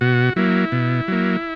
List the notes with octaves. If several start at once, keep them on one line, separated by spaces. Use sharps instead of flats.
B2 F#4
F#3 A#3 E4
B2
F#3 A#3